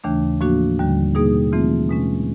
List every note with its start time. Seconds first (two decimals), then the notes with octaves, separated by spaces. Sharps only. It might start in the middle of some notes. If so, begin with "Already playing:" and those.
0.04 D#2 C#3 E3 A3 D4
0.41 A2 F3 A#3 D4 F#4
0.79 D#2 D3 G3
1.15 B2 G3 A#3 D#4 G#4
1.52 E3 A3 C4 F4
1.90 B2 G#3 C#4